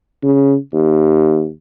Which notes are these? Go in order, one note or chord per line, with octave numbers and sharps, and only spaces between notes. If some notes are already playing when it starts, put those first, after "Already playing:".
C#3
D#2